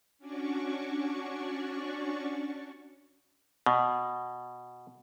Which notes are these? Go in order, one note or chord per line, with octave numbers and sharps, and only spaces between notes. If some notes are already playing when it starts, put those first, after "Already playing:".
C#4 D4 F#4 D5 C#6
B2